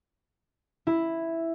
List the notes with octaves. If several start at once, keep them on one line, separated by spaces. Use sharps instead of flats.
E4